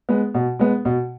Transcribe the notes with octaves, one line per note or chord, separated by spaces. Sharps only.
G#3 B3
B2
G#3 B3
B2